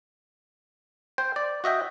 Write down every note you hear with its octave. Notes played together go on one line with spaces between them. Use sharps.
C5 G5
D5
F#4 D#5 E5 G5